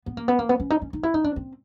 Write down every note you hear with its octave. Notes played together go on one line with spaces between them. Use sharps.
B3
A#3
B3
A#3
B3
C#4
D#4
C#4
D#4
E4
D#4
D4
C4